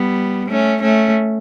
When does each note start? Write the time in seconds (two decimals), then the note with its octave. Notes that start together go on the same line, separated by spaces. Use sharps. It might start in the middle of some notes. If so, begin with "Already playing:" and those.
Already playing: G3 B3
0.49 A3 C#4
0.82 A3 C#4